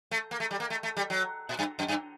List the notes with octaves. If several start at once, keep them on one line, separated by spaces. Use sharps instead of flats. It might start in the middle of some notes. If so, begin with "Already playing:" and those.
A3
A#3
A3
G3
A#3
A3
A3
G3
F#3
A#2
G2
F#2
G2